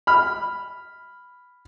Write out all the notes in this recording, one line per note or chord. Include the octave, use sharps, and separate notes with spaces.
B5 F6